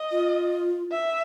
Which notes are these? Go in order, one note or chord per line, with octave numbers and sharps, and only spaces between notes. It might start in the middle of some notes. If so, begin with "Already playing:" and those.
Already playing: D#5
F4
E5